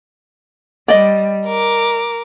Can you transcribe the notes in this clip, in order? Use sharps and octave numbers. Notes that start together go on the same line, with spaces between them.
G3 D5 D#5
A#4 D6